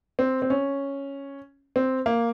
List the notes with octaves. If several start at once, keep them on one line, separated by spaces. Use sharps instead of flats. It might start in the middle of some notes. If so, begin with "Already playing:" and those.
C4
C4
C#4
C4
A#3